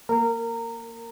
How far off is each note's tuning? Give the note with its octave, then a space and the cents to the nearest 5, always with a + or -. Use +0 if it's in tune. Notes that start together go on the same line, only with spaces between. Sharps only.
A#3 +0 A#4 -20